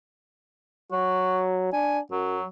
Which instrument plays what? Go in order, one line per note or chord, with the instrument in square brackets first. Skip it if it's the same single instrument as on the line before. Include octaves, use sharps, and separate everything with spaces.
[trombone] F#3 [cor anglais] F#4
[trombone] D4 [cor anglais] G#5
[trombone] F#2 [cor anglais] F#3